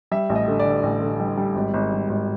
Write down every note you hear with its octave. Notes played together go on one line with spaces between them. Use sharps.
G3 E5
A1
D#5
D3
D5
D3
A1
D3
G3
G3
G#1
G#1
G3
G#1